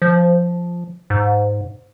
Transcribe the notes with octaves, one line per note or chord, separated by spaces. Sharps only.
F3
G#2